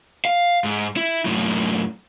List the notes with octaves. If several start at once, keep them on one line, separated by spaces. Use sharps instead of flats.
F5
G#2
E4
F#2 A2